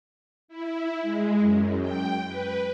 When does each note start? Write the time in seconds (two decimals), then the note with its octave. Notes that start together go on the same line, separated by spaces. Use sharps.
0.48 E4
1.02 G#3
1.38 F#2
1.80 G5
2.27 B4